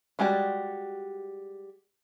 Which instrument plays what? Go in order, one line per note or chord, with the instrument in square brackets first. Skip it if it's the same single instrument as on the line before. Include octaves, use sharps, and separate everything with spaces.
[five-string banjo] G3 G#3 F#4 G4 D5